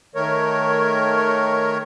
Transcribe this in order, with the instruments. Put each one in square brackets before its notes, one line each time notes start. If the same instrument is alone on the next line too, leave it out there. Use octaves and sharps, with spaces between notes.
[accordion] D#3 A3 A#4 C#5